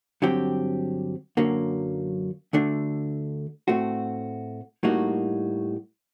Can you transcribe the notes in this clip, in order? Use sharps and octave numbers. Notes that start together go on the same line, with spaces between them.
G2 D3 F#3 C4 G4
F#2 D3 F#3 A#3
D2 D3 A3 D4
A2 A3 C4 F#4
A2 G3 A#3 D#4 F#4